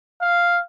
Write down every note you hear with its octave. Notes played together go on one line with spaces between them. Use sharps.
F5